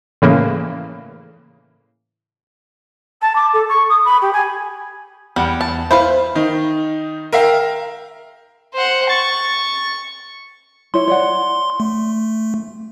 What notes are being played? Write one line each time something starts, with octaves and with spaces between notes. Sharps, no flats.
A2 C#3 E3 A#3
A5
D6
A4
C#6
D#6
B5
G4
G#5
E2 G3 F#5
A5
E4 B4 C5 F5
D#3 D#4
A#4 E5 F5 G5
C5 F#5
C#6 A6
E4 C#5 C6
C#5 D5 F#5
A3